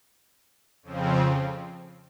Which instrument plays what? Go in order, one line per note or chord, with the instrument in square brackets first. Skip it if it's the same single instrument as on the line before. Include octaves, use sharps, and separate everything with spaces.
[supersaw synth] F2 C#3 F3 C4